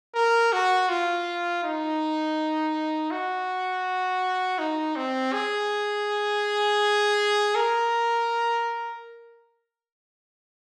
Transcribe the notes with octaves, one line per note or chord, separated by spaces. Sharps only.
A#4
F#4
F4
D#4
F#4
D#4
C4
G#4
A#4